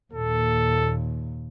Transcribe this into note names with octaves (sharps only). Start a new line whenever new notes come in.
D#2 A#2 A4